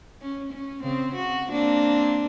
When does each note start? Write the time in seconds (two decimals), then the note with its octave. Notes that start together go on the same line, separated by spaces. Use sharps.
0.22 C#4
0.53 C#4
0.83 C#3 C4
1.15 F#4
1.51 A#3 C4 D4